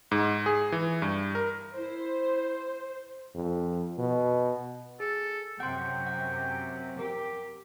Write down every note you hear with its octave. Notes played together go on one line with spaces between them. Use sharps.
G#2
G#4
E3
G2
A#4
E4 C5
F2
B2
G#4 A4
F#2 C3 F#5 G5 C6
F#5
G4 A#4